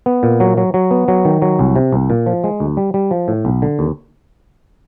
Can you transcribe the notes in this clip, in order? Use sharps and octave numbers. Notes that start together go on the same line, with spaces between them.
B3
A#2
F#3
F#3
F#3
B3
F#3
D#3
F#3
C2
C3
C2
A#2
F3
G#3
D2
G3
G3
F3
A2
B1
D3
D#2